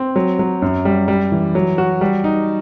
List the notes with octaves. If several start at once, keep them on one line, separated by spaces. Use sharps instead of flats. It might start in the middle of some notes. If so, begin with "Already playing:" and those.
Already playing: C4
F#3
F#3
F#2
G3
G3
E3
F#3
F#4
G3
D#4